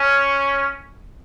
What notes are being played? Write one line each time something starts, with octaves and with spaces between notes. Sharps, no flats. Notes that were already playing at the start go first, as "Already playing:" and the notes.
Already playing: C#4